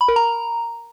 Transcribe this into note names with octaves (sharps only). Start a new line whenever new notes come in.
B5
A#4
A#5